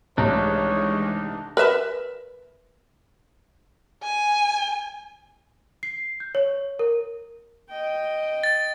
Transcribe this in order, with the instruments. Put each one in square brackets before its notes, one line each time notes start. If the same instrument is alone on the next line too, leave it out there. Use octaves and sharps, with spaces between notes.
[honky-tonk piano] C2 A3 [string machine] E3 G#3 [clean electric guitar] D4 D#4 [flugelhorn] C#5
[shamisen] A#4 B4 E5
[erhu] G#5
[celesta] C7
G6
C#5
A#4
[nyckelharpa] D#5 G5
[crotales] A6